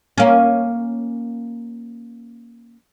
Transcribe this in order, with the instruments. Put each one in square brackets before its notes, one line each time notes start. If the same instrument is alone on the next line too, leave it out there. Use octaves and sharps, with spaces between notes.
[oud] A#3 C#4